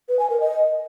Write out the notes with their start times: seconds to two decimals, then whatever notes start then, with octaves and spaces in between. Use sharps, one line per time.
0.09 B4
0.19 G#5
0.30 A#4
0.40 D#5